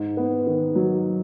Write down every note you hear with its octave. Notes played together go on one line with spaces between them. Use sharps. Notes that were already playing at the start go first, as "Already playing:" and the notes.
Already playing: G#2
B3
D#3
F#3